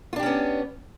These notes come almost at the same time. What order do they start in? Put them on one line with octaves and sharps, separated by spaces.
F4 D4 G4 C#4 B3